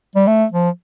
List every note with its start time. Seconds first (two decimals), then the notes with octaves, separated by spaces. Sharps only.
0.15 G3
0.27 A3
0.52 F3